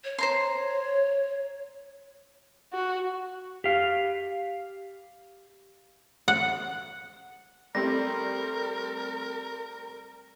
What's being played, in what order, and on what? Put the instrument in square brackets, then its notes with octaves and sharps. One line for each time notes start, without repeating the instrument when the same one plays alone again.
[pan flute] C#5
[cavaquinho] C5 A#5 C6
[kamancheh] F#4
[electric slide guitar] G4 F5
[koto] F#5
[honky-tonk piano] G3 A3 C4 [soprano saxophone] A#4 [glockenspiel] A#6